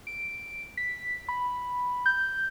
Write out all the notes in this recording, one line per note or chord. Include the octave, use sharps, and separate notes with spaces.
D7
B6
B5
G6